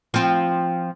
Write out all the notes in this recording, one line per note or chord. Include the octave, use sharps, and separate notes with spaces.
F3 C4